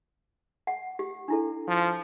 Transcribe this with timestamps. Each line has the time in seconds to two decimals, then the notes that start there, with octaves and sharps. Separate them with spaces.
0.67 F#5
0.99 G4
1.28 D4 E4 A4
1.68 F3